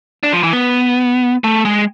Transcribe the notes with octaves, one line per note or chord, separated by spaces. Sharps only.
D4
F3
E3
B3
A3
G#3